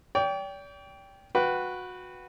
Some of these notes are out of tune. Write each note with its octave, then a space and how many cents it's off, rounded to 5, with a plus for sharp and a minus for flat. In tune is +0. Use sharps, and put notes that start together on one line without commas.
D5 -45 G5 +0
F#4 -20 B4 +0 G5 -20